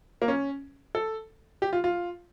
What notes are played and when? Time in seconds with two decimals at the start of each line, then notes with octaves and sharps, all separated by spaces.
0.22 A#3
0.28 C#4
0.95 A4
1.62 G4
1.73 F4
1.84 F4